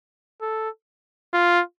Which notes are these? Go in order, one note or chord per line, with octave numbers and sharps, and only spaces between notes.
A4
F4